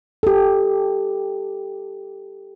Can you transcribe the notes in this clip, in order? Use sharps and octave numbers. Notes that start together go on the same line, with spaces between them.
G4 A4